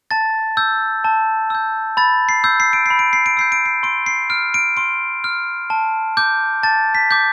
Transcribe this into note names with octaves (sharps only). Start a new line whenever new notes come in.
A5 A6
E6 G6
A5
E6 G6
B5 A6
C7
E6 G6
C7
D7
B5 C7
D7
C7
D7
E6 G6 C7
D7
C7
C6 D7
C7
F6 D7
D7
C6 D7
F6
A5
D6 G6
A5 A6
B6
D6 G6